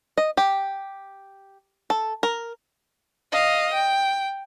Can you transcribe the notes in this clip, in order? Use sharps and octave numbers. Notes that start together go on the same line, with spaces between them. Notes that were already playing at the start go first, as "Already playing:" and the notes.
D#5
G4
A4
A#4
D#5 F5
G5